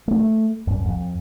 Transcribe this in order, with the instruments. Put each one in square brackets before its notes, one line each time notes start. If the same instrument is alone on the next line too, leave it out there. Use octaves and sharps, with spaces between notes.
[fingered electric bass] A3
F#2
F2